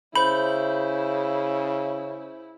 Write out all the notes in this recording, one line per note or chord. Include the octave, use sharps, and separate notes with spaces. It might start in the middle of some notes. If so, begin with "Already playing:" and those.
C#3 E4 C5 B5 G6